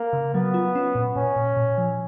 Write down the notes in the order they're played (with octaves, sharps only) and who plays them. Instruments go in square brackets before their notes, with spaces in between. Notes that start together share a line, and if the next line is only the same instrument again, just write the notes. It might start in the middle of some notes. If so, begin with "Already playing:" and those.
Already playing: [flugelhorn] A#3
[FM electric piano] C#3
[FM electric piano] F#3 [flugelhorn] B3
[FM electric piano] F4
C#4
A#2
[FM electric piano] A#2 [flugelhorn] C#4
[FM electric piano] A#2
A#2
F3